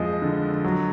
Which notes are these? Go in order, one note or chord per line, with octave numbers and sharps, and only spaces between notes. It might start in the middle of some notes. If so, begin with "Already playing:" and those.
Already playing: F2 F3 G#3 D#5
D3
F#3